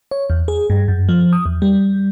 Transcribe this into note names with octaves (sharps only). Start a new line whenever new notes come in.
C#5
E2
G#4
G2
F#2
F3
D#6
E2
G3